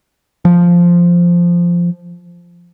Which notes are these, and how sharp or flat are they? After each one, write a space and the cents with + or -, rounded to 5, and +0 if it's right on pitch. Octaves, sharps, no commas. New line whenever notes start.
F3 -5